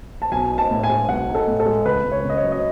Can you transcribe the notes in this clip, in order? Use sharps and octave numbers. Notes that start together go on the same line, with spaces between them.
A5
B1 G#5
D#4
A5
A2
G#5
G#3
B1 F#5
D#4
A4
A2
A4
G#3
C#2 B4
C#2
C#5
C#3
D#5
C#5
F#3
D#5